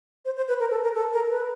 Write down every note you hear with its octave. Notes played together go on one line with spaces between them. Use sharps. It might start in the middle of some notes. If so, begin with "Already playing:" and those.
C5
C5
B4
A#4
A4
A#4
A4
A#4
B4